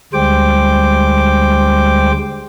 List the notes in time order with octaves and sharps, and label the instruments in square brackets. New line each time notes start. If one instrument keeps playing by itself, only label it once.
[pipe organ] D2 G3 G#3 C5 G5 D6